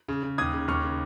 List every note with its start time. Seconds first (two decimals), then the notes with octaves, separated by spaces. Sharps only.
0.08 C#3
0.23 C#3
0.38 D#2 D#6 G#6
0.54 C#3
0.68 D#2 C#6 F6
0.83 C#3